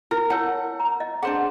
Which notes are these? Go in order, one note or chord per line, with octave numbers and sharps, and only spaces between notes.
E4 A#4
A#4 C#5 F#5 A5
A#5
D#5
D4 G#4 C5 F#5 C6